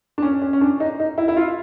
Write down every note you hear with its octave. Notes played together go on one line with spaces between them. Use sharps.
D4
C#4
C#4
C#4
D4
D#4
D#4
E4
E4
F4